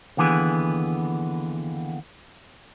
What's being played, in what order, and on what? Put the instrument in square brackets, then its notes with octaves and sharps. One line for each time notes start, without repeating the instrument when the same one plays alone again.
[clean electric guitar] D#2 D3 E3 B3 G#4